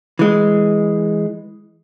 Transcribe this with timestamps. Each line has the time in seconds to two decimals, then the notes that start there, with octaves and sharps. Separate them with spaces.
0.19 E3 G#3